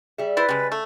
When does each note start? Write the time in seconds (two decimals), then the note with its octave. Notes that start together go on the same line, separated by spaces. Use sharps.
0.18 G3 G#4 E5
0.37 E4 B4 C5 A6
0.49 C#3 G3 G#3
0.72 A3